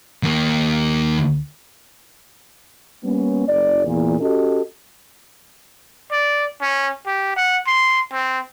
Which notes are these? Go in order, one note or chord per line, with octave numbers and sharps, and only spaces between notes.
D#2 A#3
G3 A#3 B3 C#4
F#1 D5
E2 A#2
C#4 F#4 G4 A4 D#5
D5
C#4
G4
F#5
C6
C4